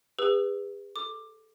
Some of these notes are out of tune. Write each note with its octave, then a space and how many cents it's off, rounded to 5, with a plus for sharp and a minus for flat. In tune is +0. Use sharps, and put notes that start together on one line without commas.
G#4 -45 B4 +0 E6 +10
A4 +0 D6 +10